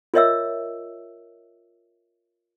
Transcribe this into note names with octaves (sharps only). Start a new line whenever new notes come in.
F4 A#4 C#5 D#5 E5 E6